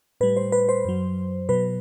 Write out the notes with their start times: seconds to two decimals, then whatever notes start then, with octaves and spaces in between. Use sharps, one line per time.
0.21 A2 G3 B4
0.37 C5
0.52 B4
0.69 C5
0.85 F#2 F#3
1.49 B2 F#3 B4